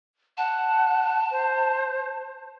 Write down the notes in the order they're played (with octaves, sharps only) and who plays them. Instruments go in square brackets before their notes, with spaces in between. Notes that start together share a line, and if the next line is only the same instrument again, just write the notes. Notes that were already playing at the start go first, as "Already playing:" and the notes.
[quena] F#5 [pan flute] A5
[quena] C5